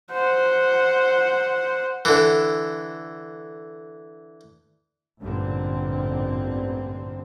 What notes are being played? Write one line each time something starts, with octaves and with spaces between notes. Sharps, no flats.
C5 F#5
D3 E3
A1 G2 A#2 D3 C4